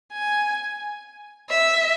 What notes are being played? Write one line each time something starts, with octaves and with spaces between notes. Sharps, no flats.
G#5
E5